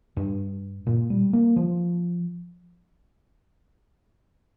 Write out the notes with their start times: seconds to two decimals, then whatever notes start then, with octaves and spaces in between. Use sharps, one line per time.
0.17 G2
0.87 A#2
1.10 G3
1.33 A#3
1.56 F3